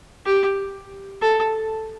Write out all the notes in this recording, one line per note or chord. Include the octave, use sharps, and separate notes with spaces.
G4
A4